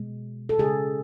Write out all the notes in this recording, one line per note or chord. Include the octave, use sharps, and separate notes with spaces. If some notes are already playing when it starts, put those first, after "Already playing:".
Already playing: B2 G#3
A4
C#3 G#3 G#4